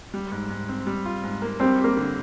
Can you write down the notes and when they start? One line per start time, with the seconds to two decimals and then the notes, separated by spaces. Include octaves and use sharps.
0.14 G3
0.32 G#2
0.50 G#2
0.69 C4
0.87 G3
1.06 F4
1.23 G#2
1.42 A#3
1.60 G3 C4
1.78 G4
1.84 A#3
1.97 D3